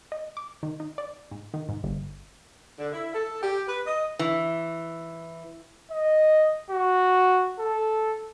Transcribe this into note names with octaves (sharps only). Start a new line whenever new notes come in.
D#5
D6
D#3
D#4
D5
G#2
D#3
G#2
G1
D3
E4
A4
G4
B4
D#5
E3
D#5
F#4
A4